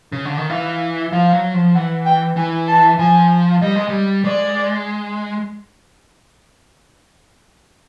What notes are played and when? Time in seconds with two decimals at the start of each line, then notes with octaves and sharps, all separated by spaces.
0.12 C#3
0.25 D3
0.37 D#3
0.50 E3 F5
1.12 F3 F5
1.33 F#3
1.54 F3
1.75 E3 F#5
2.06 G5
2.37 E3 G#5
2.68 A5
2.99 F3 G#5
3.62 G3 D#5
3.76 G#3
3.89 G3
4.24 G#3 D5